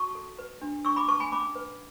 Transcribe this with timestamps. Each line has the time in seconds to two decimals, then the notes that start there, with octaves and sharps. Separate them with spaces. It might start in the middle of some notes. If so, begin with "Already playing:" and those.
Already playing: F#4 A5 C#6
0.15 A4
0.39 B4
0.61 D4
0.85 D4 C#6 E6
0.96 B5 D6
1.08 B4 A5 C#6
1.20 G#5 B5
1.32 C#4 B5 D6
1.55 B4